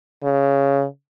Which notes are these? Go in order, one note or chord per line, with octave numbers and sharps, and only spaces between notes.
C#3